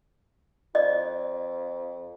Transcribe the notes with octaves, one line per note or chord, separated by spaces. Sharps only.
F2 D5 D#5